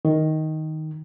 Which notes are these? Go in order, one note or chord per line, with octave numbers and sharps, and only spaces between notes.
D#3